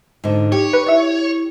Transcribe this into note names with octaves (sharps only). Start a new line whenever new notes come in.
G#2 D3 D#4
G4 C#5
B4
E4 D5 E5